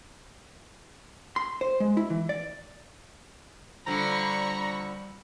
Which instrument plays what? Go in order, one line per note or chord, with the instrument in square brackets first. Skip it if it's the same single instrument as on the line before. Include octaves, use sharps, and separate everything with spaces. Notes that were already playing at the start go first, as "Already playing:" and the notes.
[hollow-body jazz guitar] C6
C5
G#3
E4
E3
D5
[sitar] D3 F3 [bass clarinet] G3 [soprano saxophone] A#5 [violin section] B5 C#6